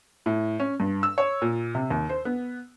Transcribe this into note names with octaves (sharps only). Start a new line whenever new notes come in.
A2
C#4
G2
E6
C#5
A#2
C3
D#2
C5
B3